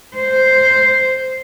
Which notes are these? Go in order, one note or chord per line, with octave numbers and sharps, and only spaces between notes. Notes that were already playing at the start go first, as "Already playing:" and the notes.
C5